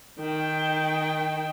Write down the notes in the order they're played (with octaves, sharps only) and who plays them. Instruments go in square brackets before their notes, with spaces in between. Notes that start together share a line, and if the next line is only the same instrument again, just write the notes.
[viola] D#3 G5